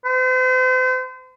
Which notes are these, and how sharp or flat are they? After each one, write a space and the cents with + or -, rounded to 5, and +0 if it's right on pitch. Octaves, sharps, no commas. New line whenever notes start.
C5 -40